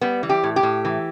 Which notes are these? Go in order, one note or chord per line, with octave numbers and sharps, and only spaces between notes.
G3 B3
E3
G4
A2
G4
A2
E3